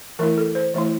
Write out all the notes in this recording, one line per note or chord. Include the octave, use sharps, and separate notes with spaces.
E3 A3 E4 A#4
A4
C5
E3 A3 E4